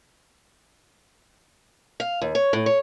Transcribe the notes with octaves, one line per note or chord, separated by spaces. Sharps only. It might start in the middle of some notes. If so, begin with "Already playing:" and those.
F5
D#2
C#5
A2
C#5